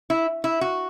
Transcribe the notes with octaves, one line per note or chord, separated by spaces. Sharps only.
E4
E4
F#4